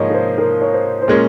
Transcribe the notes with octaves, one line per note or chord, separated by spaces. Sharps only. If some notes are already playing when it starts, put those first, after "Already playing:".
Already playing: G#2 F3 A#3 D#4 G#4 C#5 D#5
A#4
C5
A#4
C#5
C5
C5
A#2 G#3 C#4 A#4